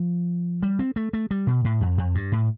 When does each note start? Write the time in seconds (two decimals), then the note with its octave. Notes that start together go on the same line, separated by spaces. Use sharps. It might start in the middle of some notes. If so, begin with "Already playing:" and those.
Already playing: F3
0.63 G3
0.79 C4
0.96 A3
1.13 A3
1.31 G3
1.47 B2
1.65 A2
1.81 F2
1.98 F2
2.15 G2
2.32 A2